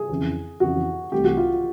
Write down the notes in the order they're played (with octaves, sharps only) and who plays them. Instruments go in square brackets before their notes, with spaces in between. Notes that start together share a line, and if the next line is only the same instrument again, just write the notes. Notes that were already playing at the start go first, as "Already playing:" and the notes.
Already playing: [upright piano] G#4
[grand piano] F2 C#3 E3
[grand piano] F2 C#3 E3 [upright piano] F#4
[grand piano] C2 C3 E3 A3 [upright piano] G4
[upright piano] F#4
F4